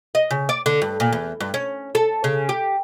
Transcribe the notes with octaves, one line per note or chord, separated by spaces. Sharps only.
D#5
C#3
D5
D3
G2
A#2
E2
G2
C#4
A4
C#3
G4